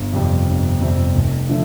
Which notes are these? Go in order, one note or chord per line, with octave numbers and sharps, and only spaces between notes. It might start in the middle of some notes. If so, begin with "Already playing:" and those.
Already playing: G1
F2 C3 G3 C4
G1
F2 C3 G3 C4
F1
D3 F3 A3